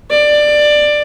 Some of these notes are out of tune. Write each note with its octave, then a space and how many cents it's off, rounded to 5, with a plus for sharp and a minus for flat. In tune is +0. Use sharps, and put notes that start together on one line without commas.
D5 +15